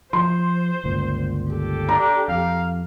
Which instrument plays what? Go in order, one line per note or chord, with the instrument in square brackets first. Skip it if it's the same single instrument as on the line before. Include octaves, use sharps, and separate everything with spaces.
[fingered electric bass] F3 [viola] C5 [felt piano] C6
[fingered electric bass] G1 C#2 A#2
[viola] G4 A4
[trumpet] D4 [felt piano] A#5
[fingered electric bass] F2 [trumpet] F5